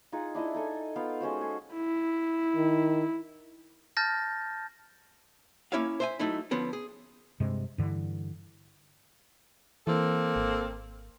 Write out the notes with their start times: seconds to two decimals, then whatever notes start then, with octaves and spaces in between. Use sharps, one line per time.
0.12 D#4 F4 G#4 F#5
0.35 D4 E4 D#5 E5
0.54 D#4 A4 G#5
0.96 B3 F4 F5 G5
1.20 G#3 C#4 F#4 C5
1.41 F#4 G#4 A4
1.74 E4
2.56 D#3
3.97 A5 F6 G6 A6 A#6
5.72 A#3 C#4 E4 C#5 E5 F5
6.00 C5 E5 G#5
6.19 F#3 A3 D#4 E4
6.51 D3 F3 B3 C#4
6.73 G#4
7.40 G2 C3 G#3
7.78 G2 D3 E3
9.87 E3 A#3 C4 A4
10.36 G#1